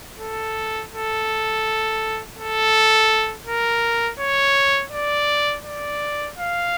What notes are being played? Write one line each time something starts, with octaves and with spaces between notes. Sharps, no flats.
A4
A4
A4
A#4
C#5
D5
D5
F5